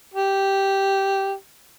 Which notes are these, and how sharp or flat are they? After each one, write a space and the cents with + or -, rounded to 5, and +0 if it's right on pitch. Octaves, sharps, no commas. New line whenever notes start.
G4 -5